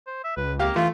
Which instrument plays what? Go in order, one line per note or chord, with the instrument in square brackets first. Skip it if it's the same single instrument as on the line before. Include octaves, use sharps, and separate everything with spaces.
[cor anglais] C5
E5
[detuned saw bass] C#2 [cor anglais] B4
[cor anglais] A#3 [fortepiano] G4 F5
[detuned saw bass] E3 [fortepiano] A3 [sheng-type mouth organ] F4